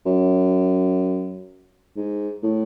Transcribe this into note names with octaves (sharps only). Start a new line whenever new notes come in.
F#2
G#2
A2